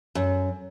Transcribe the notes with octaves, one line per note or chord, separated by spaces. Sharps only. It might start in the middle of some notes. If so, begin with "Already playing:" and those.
F#2